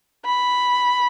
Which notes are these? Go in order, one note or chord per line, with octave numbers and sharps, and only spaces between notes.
B5